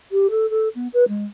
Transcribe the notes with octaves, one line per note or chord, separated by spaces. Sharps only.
G4
A4
A4
B3
B4
G#3